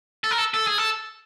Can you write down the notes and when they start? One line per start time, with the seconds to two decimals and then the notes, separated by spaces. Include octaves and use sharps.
0.24 A4
0.31 A#4
0.38 A4
0.54 A4
0.67 G#4
0.78 A4